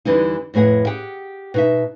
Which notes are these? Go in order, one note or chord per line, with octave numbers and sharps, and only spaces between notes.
E2 D3 E3 G3 D#4
F2 A2 B3 G#4 F#5
G4 G#4 F#5 G5
B2 D#4 E5